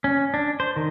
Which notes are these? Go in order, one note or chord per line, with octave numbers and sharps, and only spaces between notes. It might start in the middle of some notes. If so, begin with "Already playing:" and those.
C#4
D4
C5
D#3